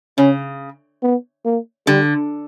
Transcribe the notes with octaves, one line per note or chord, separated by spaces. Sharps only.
C#3 C#4
B3
A#3
D3 G3